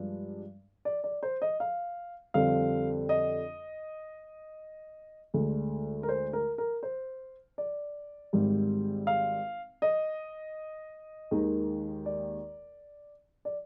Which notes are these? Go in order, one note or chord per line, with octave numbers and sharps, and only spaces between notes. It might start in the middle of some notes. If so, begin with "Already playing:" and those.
Already playing: G2 F3 G#3 D4
D5
D5
C5
D#5
F5
F2 D3 G3 C4 F5
D#5
D2 D3 G#3
A#4
C5
A#4
A#4
C5
D5
G#1 G#2 G3
F5
D#5
D#2 D#3 G#3 D#4
D5
D5